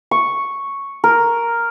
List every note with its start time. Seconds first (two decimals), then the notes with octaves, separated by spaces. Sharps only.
0.11 C#6
1.04 A#4